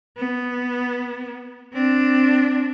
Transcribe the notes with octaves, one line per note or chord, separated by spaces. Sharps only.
B3
C4 D4